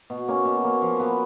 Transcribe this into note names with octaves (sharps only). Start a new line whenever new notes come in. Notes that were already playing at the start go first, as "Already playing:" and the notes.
B2
A#3 C#4
B2
A#3 C#4
F3
B3 F#4 B4